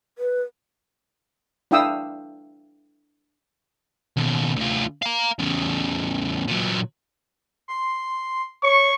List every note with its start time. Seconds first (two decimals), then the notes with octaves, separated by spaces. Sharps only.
0.18 B4
1.71 D4 E4 F5 G5 D#6 E6
4.17 D#2 B2
4.57 D2 F4
5.02 F5 A#5
5.39 E2 C#3
6.47 A#2 F#3
7.68 C6
8.63 C#5 C#6